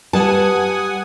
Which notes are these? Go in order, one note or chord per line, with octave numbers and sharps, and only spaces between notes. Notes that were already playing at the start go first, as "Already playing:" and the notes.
G3 B4 F#5 G#5 A5 D#6